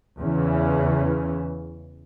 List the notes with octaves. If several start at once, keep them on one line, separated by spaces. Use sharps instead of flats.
E2 C#3 E3 C#4